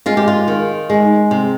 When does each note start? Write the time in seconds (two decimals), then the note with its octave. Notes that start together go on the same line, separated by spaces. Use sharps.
0.06 G#3 F4
0.17 G4
0.28 F4
0.48 D#3
0.90 G#3
1.31 C3